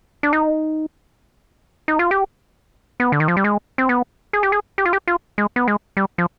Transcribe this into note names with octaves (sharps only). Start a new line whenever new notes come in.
D4
D#4
D#4
F4
G4
B3
D3
D#3
F3
G3
G#3
C4
B3
G#4
G4
G#4
G4
F4
G4
F4
G#3
B3
G#3
G3
F3